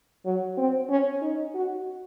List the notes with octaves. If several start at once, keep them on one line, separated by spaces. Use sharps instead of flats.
F#3
C4
C#4
D#4
F#4